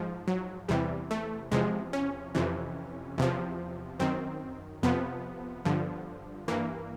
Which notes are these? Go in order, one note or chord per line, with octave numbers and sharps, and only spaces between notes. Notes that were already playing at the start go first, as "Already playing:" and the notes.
Already playing: G#2 F3
F#3
E2 C3 E3 G3
A3
E2 C3 F3 G#3
C#4
F2 C3 E3
E2 C3 F3
F#2 D#3 C4
F2 C3 F3 B3
G2 D3 F3
G2 E3 A#3